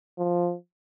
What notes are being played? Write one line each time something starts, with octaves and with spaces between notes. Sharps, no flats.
F3